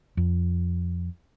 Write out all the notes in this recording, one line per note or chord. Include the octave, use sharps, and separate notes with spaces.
F2